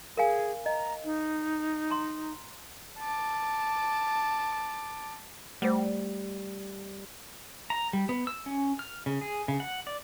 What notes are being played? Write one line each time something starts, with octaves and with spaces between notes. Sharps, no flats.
G#4 A#4 F5 G#5
D#5 A#5
D#4
A#5 C6
A5 D6
G3 A3 C5
A#5
G3
B3
E6
C#4
F6
C#3
G#4
C#3
F#5
D5